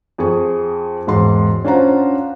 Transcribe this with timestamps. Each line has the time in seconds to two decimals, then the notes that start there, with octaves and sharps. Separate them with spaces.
0.18 F2 G#4 C#6
1.07 E1 G#2 C6
1.64 C#4 D4 F4 C5 F#5 A#5